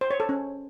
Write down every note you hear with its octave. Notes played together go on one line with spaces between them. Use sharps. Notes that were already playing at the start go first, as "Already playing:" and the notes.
C5
C#5
A4
C#4